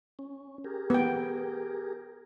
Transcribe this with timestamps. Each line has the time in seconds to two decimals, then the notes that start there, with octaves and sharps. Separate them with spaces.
0.19 C#4
0.64 G4 G#4 A#4
0.90 B3 G5